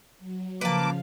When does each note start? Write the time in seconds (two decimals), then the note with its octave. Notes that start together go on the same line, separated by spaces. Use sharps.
0.19 F#3
0.61 C#3 F3 A#3 B4 F5 A5 D6